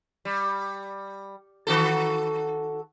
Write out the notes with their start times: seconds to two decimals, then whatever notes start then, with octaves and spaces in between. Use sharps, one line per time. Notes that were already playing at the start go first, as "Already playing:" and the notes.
0.25 G3
1.67 D#3 F#4 A4